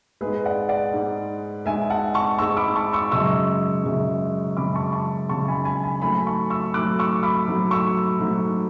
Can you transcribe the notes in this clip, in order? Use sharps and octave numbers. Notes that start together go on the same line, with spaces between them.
G#2 G#3 G#4 B4
D5 F#5
D5 F#5
G#2 G#3
G#2 G#3 E5 G#5
F#5 A5
A5 C#6
G#2 G#3 C#6 E6
B5 D6
A5 C#6
C#6 E6
F#2 C#3 G#3 C#6 E6
F#2 C#3 G#3
F#2 C#3 G#3 B5 D6
A5 C#6
A5 C#6
F#2 C#3 G#3 A5 C#6
G#5 B5
G#5 B5
G#5 B5
G#2 F#3 A3 G#5 B5
A5 C#6
C#6 E6
G#2 F#3 A3 D6 F#6
C#6 E6
B5 D6
G#2 F#3 A3
C#6 E6
G#2 F#3 A3